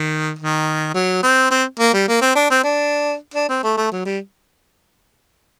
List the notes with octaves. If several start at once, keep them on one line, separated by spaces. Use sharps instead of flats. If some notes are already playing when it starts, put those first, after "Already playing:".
Already playing: D#3
D#3
F#3
C4
C4
A#3
G3
A#3
C4
D4
C4
D4
D4
C4
A3
A3
F#3
G3